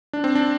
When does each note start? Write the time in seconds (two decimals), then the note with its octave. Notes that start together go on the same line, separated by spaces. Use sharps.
0.13 D4
0.24 C4
0.35 D4